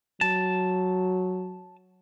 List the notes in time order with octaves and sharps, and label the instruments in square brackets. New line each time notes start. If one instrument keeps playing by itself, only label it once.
[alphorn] F#3 [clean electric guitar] A5